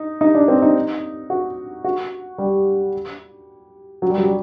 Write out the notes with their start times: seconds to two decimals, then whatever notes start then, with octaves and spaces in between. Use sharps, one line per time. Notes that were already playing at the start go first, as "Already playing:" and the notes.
Already playing: D#4
0.21 D#4
0.35 D4
0.48 C4
0.62 D#4
1.30 F#4
1.84 F#4
2.38 G3
4.02 F#3
4.10 G3
4.18 F#3
4.25 G3